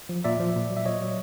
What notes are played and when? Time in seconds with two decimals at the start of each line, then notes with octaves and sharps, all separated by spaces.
0.09 F3
0.24 A#2 D5 E5
0.40 F3
0.55 A#2
0.70 F#3
0.77 E5
0.85 A#2 C#5 D#5
1.01 F#3